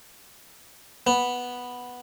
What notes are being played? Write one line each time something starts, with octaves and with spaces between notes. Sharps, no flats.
B3